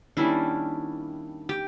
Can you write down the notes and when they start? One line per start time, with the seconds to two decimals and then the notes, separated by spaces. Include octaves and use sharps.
0.17 D#3 G3 A#3 C#4 D4 E4
1.49 G4